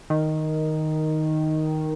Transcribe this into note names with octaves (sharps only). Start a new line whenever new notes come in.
D#3